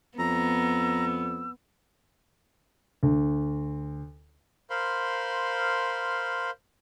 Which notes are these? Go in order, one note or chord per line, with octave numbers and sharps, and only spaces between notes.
F2 B3 A#5 E6
D2
A#4 C5 F5 B5 C6